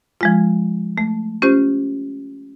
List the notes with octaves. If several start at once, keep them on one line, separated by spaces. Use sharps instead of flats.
F3 G#3 F4
A3
C#4 F4 G4 C5